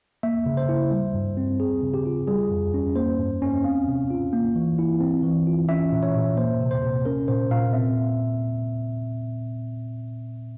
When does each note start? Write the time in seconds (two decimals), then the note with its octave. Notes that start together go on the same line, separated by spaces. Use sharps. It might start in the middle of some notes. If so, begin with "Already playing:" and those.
0.23 A#3 E5
0.46 C#3
0.57 C5
0.69 E4
0.91 G3
1.14 G2
1.37 C4
1.60 C4 G#4
1.82 C#3
1.94 G4
2.06 F4
2.27 G3 G#4
2.51 F2
2.74 C#4
2.96 A#3 C5
3.19 G2
3.42 C#4
3.64 C4 F5
3.88 C3
4.10 F4
4.33 A#3
4.55 E3
4.79 E4
5.00 C4
5.23 E3
5.47 F4
5.69 C#4 E5
5.92 A#2
6.03 C#5
6.15 A#2
6.37 A#3 C5
6.61 C3
6.71 C5
6.82 C3
7.06 C#4 A#4
7.28 A#2 C5
7.51 A#2 F5
7.73 C4 E5